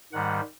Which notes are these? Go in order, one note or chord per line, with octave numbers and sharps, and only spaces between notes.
G#2 D#3 G3 F#5